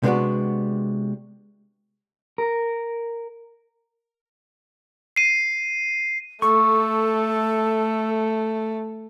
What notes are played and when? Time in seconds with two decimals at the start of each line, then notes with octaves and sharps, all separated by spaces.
0.03 C3 G#3 B3 C#4 D4 F#4
2.38 A#4
5.16 C7 D#7
6.42 A3 A4 C#6